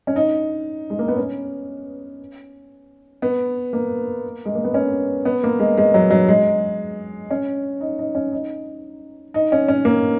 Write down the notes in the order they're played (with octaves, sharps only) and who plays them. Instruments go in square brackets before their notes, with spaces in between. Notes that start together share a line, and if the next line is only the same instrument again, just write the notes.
[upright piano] C#4
D#4
G#3
A#3
B3
C#4
B3
A#3
G#3
A#3
B3
C#4
B3
A#3
G#3
G#3
F#3
F#3
G#3
C#4
D#4
D#4
C#4
D#4
D#4
C#4
C#4
A#3